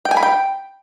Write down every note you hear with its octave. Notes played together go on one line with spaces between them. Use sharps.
G5
G#5
B5
G5